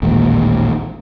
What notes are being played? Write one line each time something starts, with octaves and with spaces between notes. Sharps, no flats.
A1 D#2 A#2 G#3